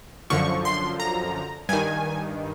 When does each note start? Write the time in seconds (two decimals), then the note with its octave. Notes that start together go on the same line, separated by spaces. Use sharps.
0.30 F#2 D3 F3 C#6
0.65 C6
1.00 A#5
1.69 G2 D#3 G#5